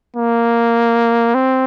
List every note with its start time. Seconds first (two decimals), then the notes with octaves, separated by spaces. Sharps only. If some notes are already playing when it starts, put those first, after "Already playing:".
0.17 A#3
1.35 C4